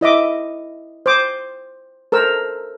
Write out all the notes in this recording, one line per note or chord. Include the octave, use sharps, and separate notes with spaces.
E4 D#5 E5 D6
C5 D6 D#6
A4 A#4 C5 E6